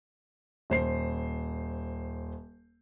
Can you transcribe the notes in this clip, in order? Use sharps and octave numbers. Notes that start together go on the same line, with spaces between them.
D#1 C5 C7